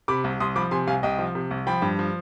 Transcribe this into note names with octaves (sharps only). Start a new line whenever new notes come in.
C3 B5 D6
C2
C2 C6 D#6
F3 B5 D6
C3 G#5 C6
C2 F5 G#5
C2 D#5 G5
F3
C3
C2
F3 G5 B5
G2
F3